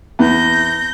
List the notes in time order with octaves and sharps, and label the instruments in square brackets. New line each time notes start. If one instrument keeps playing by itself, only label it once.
[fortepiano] E2 [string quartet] G6 A#6